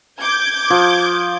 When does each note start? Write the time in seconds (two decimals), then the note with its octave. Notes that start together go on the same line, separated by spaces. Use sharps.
0.19 D6 G6 G#6
0.70 F3